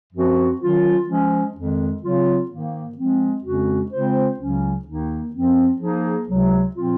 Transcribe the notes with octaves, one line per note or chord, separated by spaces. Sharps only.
F#2 F3 C4 F#4
D#3 F#3 C#4 F4
F3 G#3 C#4
F2 D#3 G#3
C#3 F#3 C4 F4
G#2 D#3 A#3
F3 G#3 C4
F2 C#3 G#3 C#4 F#4
C#3 G#3 C4 F4 C5
C#2 C#3 F#3 C#4
D#2 D#3 A#3 D#4
F#2 F3 C4
F3 A#3 D#4 G#4
C#2 C3 F#3
A#2 F3 C4 F4